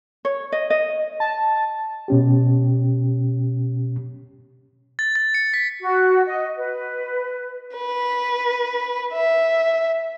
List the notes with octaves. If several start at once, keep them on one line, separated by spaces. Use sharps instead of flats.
C#5
D#5
D#5
A5
B2 C#4 G4
A6
A6
C#7
B6
F#4
D#5
B4
B4
E5